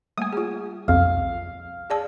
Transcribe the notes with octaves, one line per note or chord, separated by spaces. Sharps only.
G3 A3 A#3 G#5 D#6
F4 G#4
B1 F2 F5
G#4 D5 A5